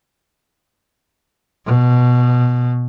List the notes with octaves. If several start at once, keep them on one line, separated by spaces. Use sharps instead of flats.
B2